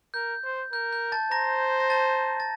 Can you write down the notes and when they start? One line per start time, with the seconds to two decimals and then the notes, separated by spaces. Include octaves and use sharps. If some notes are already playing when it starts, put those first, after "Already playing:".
0.14 A#4 G6
0.44 C5
0.72 A#4 G6
0.93 G6
1.12 A5 A6
1.31 C5 A#5 A#6
1.80 A#6
1.90 A5 A6
2.40 A6